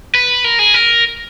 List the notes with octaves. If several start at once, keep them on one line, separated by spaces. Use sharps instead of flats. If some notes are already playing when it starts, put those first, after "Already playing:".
B4
A#4
G#4
A#4